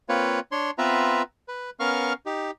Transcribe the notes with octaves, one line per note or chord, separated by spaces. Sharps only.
A#3 C4 F4 B4 C#5
D4 C#5 C6
B3 C4 F4 B4 E5 A#5
B4
B3 C#4 A#4 F5 C#6 F6
D#4 G4